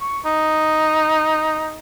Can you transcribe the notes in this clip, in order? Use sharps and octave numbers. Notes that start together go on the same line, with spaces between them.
C#6
D#4